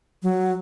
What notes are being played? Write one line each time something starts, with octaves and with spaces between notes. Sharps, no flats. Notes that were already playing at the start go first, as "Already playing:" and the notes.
F#3